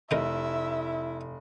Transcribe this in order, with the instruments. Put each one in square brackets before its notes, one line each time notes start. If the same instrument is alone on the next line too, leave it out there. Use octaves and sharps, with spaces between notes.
[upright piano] F1 [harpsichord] D#4 A#4 [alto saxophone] E4 [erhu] E5